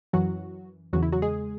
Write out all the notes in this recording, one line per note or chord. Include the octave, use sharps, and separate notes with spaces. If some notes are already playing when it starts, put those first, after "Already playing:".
F#2 E3 F#3 F#4
E2 C#3 E3 F#3 F#4
E4
F#3 F#4
G#3 G#4